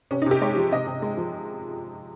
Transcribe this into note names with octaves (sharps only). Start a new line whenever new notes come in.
C3 C#4
D#4
C3 G4
G#3 C#5
F3
C3 D#5
C3
G#3
F3